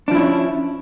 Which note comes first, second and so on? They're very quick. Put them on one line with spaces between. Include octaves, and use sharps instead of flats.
D4 F3 E4 C#4